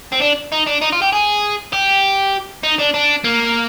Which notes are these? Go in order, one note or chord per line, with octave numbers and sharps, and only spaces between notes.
C4
D4
D#4
D4
D#4
F4
G4
G#4
G4
D#4
D4
D4
A#3